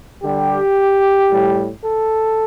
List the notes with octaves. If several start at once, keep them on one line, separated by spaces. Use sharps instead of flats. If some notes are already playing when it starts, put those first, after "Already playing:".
D3 G3 G4
A2 G3
A4